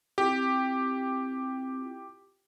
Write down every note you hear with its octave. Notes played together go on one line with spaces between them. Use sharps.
C4 E4 F4 G4